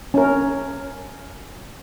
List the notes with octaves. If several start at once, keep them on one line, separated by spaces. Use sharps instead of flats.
C#4 A#4